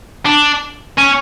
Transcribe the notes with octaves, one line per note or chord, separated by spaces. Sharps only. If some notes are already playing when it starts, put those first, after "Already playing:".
D4
C#4